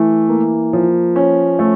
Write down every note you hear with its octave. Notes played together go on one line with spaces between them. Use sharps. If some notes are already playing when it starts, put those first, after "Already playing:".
Already playing: E3 A3
A#3
F3
C#4
A3